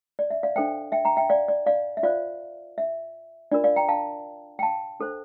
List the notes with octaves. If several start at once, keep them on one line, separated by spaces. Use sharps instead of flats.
D5
E5
D5 F5
D4 A4 C5 E5 G5
E5 G5
G5 A#5
E5 G5
D5 F5
D5
D5 F5
E5
F4 C5 D5 F5
E5
D4 F4 A#4 D5
D5 F5
G5 A#5
F5 A5
G5
F5 A5
D4 A4 C5